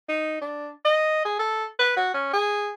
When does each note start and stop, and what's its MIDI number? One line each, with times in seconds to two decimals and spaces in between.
0.09 0.37 63
0.41 0.69 62
0.85 1.21 75
1.25 1.34 68
1.39 1.65 69
1.79 1.95 71
1.97 2.11 66
2.14 2.31 61
2.33 2.71 68